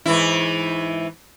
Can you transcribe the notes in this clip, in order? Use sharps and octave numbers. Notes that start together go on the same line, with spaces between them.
G#2 E3 E4